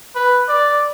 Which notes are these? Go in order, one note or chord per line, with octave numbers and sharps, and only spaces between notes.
B4
D5